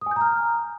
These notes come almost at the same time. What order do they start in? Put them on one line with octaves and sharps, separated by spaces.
D#6 G#5 G6 A#5 F6